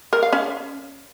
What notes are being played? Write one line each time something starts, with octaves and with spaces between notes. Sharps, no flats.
A#4
F5
C#4